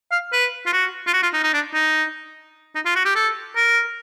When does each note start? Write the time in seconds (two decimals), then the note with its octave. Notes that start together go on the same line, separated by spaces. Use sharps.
0.12 F5
0.33 B4
0.66 F4
0.73 F#4
1.07 F4
1.13 F#4
1.23 F4
1.33 D#4
1.43 D#4
1.54 D4
1.74 D#4
2.75 D#4
2.85 F4
2.96 F#4
3.05 G4
3.15 A4
3.56 A#4